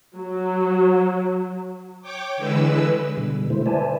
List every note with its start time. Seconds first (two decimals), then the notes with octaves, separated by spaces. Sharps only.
0.17 F#3
2.02 C#5 G5 D6
2.37 D3 E3 G#3 B4 E6
3.17 B2 D3 G3
3.50 D3 G#3 A3 E4 C5
3.66 B4 C5 D5 E5 G#5 A5